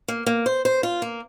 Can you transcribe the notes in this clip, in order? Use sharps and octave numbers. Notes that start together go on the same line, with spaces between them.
A#3
A#3
C5
C5
F4
A#3